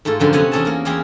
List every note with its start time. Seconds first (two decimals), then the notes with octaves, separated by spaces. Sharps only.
0.05 G#2 A3 E4 F4 A4
0.20 F#2 D3 F3 G5
0.33 C3 B3 C#4 F#4 C#5 G#5
0.52 E2 C#4 G#4 A4 G#5 A5
0.65 A#3 A#4
0.85 E2 E4 G4 G#4 F5 C6